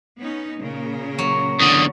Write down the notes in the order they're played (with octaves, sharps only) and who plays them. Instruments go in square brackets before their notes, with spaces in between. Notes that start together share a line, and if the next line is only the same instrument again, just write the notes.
[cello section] B3 C#4 D#4
A#2 C#3 A#4
[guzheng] F#3
[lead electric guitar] E2 D3 [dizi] D#6